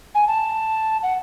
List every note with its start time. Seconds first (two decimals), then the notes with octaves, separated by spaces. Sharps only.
0.15 G#5
0.28 A5
1.03 F#5